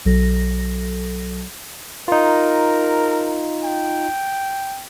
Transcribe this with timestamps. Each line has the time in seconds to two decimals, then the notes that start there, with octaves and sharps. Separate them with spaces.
0.05 B1 F#3 A4 A#6
2.08 D#4 F4 A#4
3.65 G5